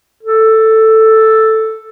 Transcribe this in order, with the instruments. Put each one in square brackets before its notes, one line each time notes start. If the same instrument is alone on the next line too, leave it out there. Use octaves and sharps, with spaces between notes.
[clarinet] A4